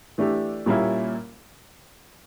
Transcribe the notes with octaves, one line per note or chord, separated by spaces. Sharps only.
E3 A3 D4 G4
A#2 G3 A#3 C#4 E4